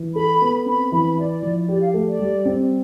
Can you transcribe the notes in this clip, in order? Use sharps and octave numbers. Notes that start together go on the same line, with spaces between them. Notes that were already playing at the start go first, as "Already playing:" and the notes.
Already playing: E3
A4 B5
B3
C4 B5
E3 B5
E4 D5
F3
G4 D5
F5
A3
D5
G3
C4